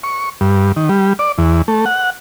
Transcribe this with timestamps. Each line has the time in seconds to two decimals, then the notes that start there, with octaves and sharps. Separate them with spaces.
0.04 C#6
0.41 G2
0.76 D#3
0.89 G3
1.19 D5
1.38 E2
1.68 A3
1.86 F#5